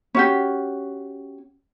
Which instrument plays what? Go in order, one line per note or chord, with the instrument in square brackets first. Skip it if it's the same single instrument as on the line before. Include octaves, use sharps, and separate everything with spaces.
[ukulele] C#4 F#4 G4